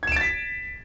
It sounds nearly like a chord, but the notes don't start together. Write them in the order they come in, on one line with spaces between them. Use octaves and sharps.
G#6 E7 D7 A6 B6